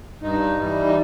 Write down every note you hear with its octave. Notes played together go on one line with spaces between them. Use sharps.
G2 D#4
E3 G3
D#4